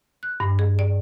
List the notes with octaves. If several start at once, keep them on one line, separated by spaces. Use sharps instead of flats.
F#6
G2
G#4
D5